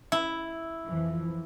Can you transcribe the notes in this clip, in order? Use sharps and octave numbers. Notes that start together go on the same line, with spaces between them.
E4
F2 E3 F3